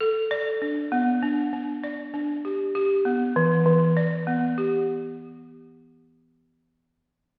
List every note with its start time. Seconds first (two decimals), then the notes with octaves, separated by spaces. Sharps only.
0.01 A4
0.31 D5
0.62 D4
0.92 B3
1.23 D4
1.53 D4
1.84 D5
2.14 D4
2.45 G4
2.75 G4
3.05 B3
3.36 E3
3.66 E3
3.97 D5
4.27 B3
4.58 G4